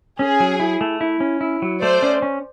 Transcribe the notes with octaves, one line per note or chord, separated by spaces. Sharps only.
C#4 G#4
F#3
E4
A3
E4
C#4
E4
F#3
A3 C5 D5
C#4
C#4